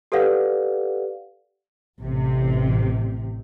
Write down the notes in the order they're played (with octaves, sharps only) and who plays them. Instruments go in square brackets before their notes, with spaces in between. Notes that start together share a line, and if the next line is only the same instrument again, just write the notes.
[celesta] G4 A4 B4 D5 F5 F#5
[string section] A1 C3